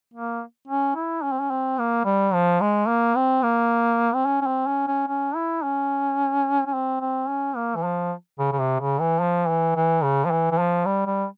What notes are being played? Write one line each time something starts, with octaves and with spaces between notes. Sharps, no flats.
A#3
C#4
E4
C#4
C4
C#4
C4
A#3
G3
F3
G#3
A#3
C4
A#3
C4
C#4
C#4
C4
C#4
C#4
C#4
E4
C#4
C#4
C4
C4
C#4
A#3
E3
F3
C#3
C#3
C3
C#3
E3
F3
E3
E3
C#3
F3
E3
E3
F3
G3
G3